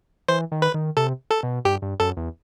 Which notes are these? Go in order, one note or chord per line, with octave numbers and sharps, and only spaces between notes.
E3 C5
D#3
B4
D#3
C3 A4
A4
B2
G2 G4
G2
F#2 A4
E2